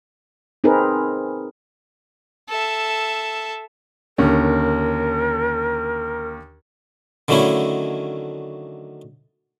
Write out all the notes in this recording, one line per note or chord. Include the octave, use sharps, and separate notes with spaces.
C4 D#4 G#4 A#4 B4
A4 E5
D#2 D3 C#4 A#4
D3 D#3 F#3 A3 C#4 E4